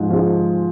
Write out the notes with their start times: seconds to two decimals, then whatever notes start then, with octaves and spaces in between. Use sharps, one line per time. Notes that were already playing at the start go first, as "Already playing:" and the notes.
Already playing: G#2 F3 G#3
0.10 F3 G#3